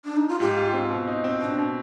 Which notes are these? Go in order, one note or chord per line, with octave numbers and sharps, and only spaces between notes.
D4
D#4
F4
G#2 G4
F4
C4
B2
D#4
C4
B2 D4
B2